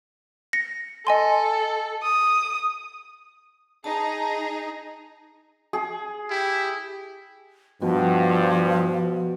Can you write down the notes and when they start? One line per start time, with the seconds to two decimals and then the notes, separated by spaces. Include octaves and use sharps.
0.53 A#6 C#7
1.07 A4 D#5 G#5 C6
2.02 D#6
3.84 D#4 G#4 A5 A#5
5.73 G#4
6.30 E4 G4
7.82 G2 B2 F3